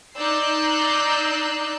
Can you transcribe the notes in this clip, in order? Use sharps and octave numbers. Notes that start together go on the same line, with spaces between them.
D#4 D5 E6 F#6 G6 C7